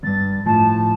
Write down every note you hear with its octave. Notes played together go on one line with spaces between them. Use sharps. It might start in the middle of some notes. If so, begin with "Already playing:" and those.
E2 G2 A6
A2 F3 A5